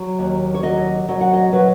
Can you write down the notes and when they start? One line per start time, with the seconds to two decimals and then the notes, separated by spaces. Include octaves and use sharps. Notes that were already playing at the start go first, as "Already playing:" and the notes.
Already playing: F#3
0.19 D#2
0.54 C#5
0.63 F#3 D#5
1.08 F#3 D#5
1.21 F#5
1.33 D#5
1.52 F#3 B4